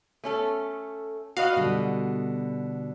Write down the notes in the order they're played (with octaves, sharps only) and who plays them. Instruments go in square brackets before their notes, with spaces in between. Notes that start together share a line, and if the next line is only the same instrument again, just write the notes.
[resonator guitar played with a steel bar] A3 C#4 A4
[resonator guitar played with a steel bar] F#4 B4 D#5 [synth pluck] F5
[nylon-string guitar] B2 D3 G3